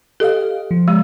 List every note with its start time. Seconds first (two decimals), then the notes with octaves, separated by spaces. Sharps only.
0.20 G4 A4 D#5 F5
0.71 F3
0.88 G#3